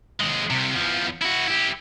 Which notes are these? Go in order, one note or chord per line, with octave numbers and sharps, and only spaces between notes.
D#2 G#3
C2 C3
E2 F3
E4 F#4
E4 G4